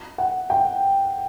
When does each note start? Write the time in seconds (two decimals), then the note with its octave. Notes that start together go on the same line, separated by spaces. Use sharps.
0.18 F#5
0.50 G5